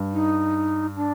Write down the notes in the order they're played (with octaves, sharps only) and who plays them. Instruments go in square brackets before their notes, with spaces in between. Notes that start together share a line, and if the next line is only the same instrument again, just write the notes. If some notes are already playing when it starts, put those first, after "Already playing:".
Already playing: [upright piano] G2
[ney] D#4
D4